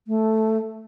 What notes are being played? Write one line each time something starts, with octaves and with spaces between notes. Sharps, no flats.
A3